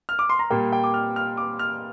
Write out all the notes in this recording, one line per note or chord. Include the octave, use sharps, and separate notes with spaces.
F6
D6
C6
A#5
A#2 G3 A#3 G5
G5
D6
F6
F6
D6
F6